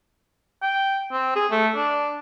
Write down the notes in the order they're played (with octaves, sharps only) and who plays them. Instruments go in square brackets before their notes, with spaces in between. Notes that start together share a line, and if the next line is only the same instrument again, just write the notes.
[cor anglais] G5
C4
G#4
A3
D4